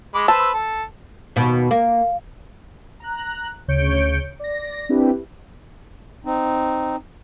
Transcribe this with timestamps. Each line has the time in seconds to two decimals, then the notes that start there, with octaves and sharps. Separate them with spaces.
0.15 G#3 B5 D6
0.28 B4 C5 A5 E6
0.54 A4
1.36 D#2 B2
1.71 A#3
3.00 A#5 F#6
3.68 D2 C#3 C#5 G6 C#7 D7
4.40 D5 A#6
4.89 C4 D4 E4 G4 B4
6.25 C4 D#4